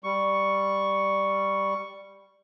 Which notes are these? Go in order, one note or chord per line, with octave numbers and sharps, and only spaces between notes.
G3 C#6